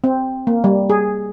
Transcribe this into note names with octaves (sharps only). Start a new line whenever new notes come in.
C4
A#3
G3
G#4